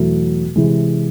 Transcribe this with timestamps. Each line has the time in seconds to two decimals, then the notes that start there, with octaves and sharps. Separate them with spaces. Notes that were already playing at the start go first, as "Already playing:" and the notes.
Already playing: E2 B2 F#3 A3
0.56 C3 E3 G#3